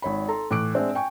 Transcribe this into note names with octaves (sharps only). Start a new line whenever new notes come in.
G#1 C#5 B5
A4 A#5 C6
A2 E3 D6 F#6 D7
G#3 C4 D4 E5
G5 G#5 C#6